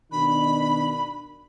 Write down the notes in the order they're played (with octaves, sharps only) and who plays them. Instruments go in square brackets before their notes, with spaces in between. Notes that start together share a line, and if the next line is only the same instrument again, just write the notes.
[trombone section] B2 D#3 D4 [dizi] B5